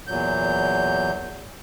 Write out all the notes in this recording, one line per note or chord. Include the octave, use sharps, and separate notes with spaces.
E2 A#2 F#3 G6